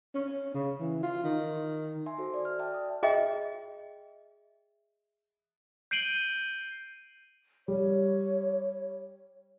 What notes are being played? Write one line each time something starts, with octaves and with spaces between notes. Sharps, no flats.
C#4
C#3
E3
F4
D#3
E5 G#5 C6
F#4 A4 C5
D5
F6
D5 E5 G5 A5
D#6
G#4 D#5 E5 G5
G6 C7 D7 D#7 F#7 G7
G3 C#5